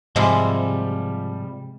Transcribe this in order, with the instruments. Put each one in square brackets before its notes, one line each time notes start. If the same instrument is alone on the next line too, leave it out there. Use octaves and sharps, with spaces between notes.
[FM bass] G#2 [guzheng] C3 G#3 [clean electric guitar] F3 G3